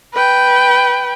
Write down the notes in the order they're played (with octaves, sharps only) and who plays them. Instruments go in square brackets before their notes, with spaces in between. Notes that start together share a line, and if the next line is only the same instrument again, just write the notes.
[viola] B4 G5